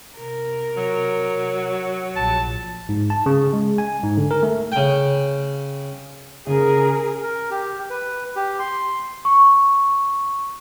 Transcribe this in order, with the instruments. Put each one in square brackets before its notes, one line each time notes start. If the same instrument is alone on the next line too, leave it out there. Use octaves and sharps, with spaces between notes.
[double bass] C3 [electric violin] A#4
[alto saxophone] F#3
[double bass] A#1 [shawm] A5
[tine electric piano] G#2
A5
C#3
G#3
G#5
G#2
D3
A#4
A3
[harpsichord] C#3 G5
[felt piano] C#3 [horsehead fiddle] G#4 A#4
[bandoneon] A#4
G4
B4
G4
C6
[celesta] C#6